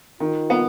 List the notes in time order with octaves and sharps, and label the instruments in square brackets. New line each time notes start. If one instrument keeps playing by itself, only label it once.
[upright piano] D#3 [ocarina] F4
[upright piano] B3